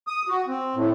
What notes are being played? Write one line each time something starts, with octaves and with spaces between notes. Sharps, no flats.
D#6
F#4
C4
A2